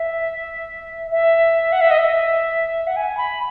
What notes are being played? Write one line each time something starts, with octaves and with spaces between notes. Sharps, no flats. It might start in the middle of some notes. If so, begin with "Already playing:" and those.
Already playing: E5
E5
F#5
E5
D#5
E5
F#5
G#5
B5